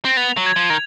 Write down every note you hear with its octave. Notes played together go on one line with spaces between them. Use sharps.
C4
B3 F7
F#3
G#6
F3
D#3